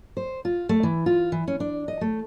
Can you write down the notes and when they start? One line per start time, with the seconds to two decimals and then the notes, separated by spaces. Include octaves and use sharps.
0.17 C5
0.45 F4
0.69 A3
0.83 E3
1.06 F4
1.32 E3
1.48 C#4
1.60 D4
1.88 D#5
2.01 A3